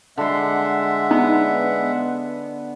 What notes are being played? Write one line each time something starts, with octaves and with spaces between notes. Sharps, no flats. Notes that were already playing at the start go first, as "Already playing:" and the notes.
D3 G#3 E5 F#5 C6
B3 D#4